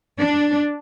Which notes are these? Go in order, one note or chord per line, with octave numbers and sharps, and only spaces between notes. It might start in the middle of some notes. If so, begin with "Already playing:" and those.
D4